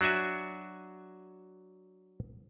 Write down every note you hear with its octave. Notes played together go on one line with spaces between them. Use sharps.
F#3 D4 F#4 E5 G#5